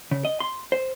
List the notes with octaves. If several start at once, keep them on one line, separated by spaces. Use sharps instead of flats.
C#3
D#5
C6
C5